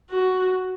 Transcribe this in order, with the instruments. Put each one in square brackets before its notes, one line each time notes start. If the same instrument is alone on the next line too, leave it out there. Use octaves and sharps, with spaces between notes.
[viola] F#4